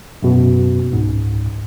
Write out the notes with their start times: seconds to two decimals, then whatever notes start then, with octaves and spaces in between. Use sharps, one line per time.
0.23 F#2 B2
0.92 C#2 G#2